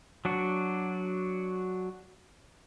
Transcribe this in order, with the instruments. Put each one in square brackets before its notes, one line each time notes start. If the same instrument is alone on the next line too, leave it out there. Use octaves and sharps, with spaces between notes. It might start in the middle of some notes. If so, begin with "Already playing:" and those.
[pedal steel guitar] F#3 D4 F#4